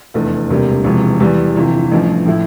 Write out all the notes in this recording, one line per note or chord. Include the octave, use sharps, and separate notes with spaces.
F1 E2 D3 A3
E1 D2 C3 G3 A#3
E1 E2 C3 F3
E2 E3 G3
G1 F2 C3 E3
A1 G2 F3 A3
A2 F3 A3 E4